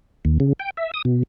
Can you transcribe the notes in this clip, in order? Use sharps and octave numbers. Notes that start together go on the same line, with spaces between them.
D#2
C#3
G5
E5
D#6
B2